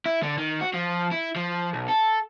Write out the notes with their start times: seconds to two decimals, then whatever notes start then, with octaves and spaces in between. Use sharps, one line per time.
0.06 E4
0.23 D3
0.38 D#3
0.61 F#4
0.74 F3
1.12 E4
1.36 F3
1.73 B1
1.88 A4